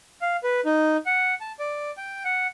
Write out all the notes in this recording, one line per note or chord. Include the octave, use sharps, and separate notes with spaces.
F5
B4
D#4
F#5
A5
D5
G5
F#5